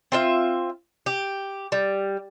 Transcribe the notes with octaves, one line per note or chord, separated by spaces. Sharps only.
C4 F4 E5
G4
G3